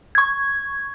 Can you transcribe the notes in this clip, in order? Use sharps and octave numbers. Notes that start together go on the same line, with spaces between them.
C#6 G#6